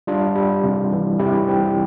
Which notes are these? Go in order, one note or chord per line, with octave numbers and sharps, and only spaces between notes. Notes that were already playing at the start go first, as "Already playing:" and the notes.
G3 D4 F4
G3
C3
E3
C3 E4 G4
C4